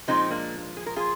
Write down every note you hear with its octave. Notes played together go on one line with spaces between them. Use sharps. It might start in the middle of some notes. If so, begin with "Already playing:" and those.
A#2 F3 G#3 C4 D#4
A#3 D4
G#4
A#4
F4 G#4